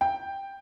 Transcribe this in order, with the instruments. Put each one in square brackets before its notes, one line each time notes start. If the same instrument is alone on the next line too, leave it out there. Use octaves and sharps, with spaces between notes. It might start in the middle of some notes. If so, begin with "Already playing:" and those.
[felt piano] G5